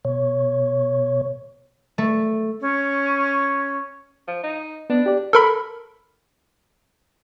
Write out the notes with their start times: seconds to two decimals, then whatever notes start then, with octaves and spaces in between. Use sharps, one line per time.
0.05 B2 C#5
1.98 A3
2.60 C#4
4.28 F3
4.43 D#4
4.90 B3 D4
5.06 G4 D5
5.33 A4 A#4 B5